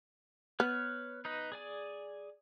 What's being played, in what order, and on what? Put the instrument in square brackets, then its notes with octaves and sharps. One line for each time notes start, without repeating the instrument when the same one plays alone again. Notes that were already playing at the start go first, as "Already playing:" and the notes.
[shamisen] B3 [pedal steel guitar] B4 C#5 F6
[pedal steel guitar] D#4 B4 D#5
G#4 D5 G#5